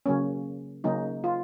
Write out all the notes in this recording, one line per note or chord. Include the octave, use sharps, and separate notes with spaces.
C#3 F#3 A#3 C#4
C#3 F#3 A#3 C#4 D#4
F4